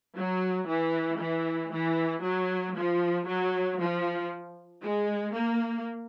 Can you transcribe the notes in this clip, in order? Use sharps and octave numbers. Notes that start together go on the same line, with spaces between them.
F#3
E3
E3
E3
F#3
F3
F#3
F3
G#3
A#3